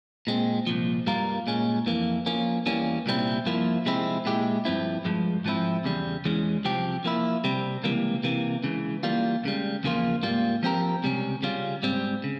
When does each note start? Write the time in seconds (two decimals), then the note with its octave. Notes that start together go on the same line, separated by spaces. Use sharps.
0.27 A#2 G#3 C4
0.67 C2 A#2 F3
1.06 G2 G3 A#3 F4 A#4
1.47 A#2 G#3 C#4
1.86 F2 E3 A#3
2.26 F3 A#3 C#4
2.66 E2 E3 G3 A#3 C#4
3.06 C2 A#2 G3 C4 E4
3.46 G2 F3 A#3 E4
3.86 C3 F3 G#3 C4 E4
4.25 A#2 G#3 E4 G4
4.65 G2 F3 C4 E4
5.05 G2 F3 G#3
5.45 G#2 F3 C4 E4
5.84 E2 C#3 G3
6.25 E2 E3 G#3 C#4
6.64 C2 C3 F3 C4 G4
7.04 F3 A#3 E4
7.44 C3 G3 C4
7.83 C#2 C3 E3 G3 A#3
8.24 C3 E3 A#3
8.64 C#2 C#3 E3
9.03 E3 G3 A#3 F4
9.44 C#2 C#3 G3
9.83 E2 C#3 F3 A#3 F4
10.23 G#2 G3 A#3 F4
10.63 F3 C4 G4 A#4
11.03 C#2 C3 G3 C#4
11.43 C#3 G3 C#4 F4
11.83 G#2 G3 C4
12.24 C#3